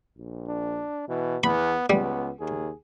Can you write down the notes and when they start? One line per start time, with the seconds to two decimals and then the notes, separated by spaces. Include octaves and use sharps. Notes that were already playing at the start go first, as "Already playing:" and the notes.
0.18 A#1
0.48 D4
1.08 B2 E3
1.44 E2 B3 B5
1.90 C#2 G3 B3
2.40 D#2 G#4